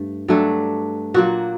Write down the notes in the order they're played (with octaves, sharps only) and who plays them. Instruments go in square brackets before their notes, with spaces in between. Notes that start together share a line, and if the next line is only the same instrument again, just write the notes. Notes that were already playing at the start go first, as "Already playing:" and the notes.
Already playing: [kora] G2 A3
G2 F#3 A3 D4
A#2 F#3 A#3 F#4